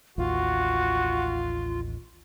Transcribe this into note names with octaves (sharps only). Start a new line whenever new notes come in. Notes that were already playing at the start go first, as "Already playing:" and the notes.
A1 D#2 F4 F#4